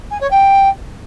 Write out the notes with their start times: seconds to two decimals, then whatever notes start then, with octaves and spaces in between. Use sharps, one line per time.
0.10 G#5
0.20 C#5
0.30 G5